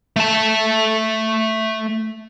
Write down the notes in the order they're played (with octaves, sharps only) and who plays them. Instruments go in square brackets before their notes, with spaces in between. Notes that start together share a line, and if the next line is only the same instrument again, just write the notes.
[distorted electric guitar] A3 A5